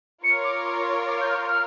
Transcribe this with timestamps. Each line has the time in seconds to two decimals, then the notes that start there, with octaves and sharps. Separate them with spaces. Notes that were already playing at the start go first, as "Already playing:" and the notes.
0.24 F4 A#4 C#5 C#7
0.44 D6
0.65 D6
1.08 D6
1.21 G6
1.28 F6
1.49 F6